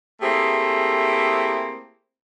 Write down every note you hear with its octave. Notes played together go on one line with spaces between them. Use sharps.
A3 A#3 C4 E4 G4 G#4